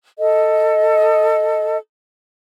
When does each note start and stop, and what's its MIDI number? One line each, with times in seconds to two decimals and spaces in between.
0.18 1.78 69
0.18 1.78 75